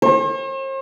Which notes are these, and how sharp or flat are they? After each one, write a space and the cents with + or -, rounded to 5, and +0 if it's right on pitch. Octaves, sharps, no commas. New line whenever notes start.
C5 +45